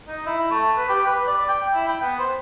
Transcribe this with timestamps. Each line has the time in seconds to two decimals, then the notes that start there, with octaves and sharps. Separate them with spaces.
0.08 D#4
0.26 E4
0.51 A3
0.77 B4
0.89 G4
1.06 B4
1.27 D5
1.48 G5
1.73 E4
1.88 G5
2.02 B3
2.19 C5